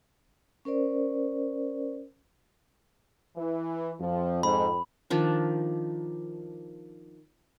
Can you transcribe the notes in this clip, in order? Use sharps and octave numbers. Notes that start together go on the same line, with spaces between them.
C#4 A#4 C5 D5
E3
F2 F3
G#2 B5
D#3 F3 D4